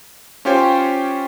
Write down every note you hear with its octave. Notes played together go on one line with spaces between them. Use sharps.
C#4 F4 G4 C5 C#5 G5